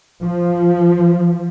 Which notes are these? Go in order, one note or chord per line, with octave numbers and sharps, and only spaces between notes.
F3